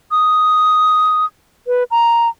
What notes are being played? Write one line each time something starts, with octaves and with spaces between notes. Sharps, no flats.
D#6
B4
A#5